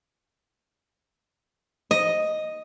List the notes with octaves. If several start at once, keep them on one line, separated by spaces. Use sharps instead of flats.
D#5